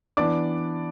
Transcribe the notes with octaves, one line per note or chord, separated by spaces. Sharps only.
E3 B3 D4 D5 D6